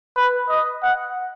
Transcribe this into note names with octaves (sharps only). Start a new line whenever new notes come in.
B4
D#5
F#5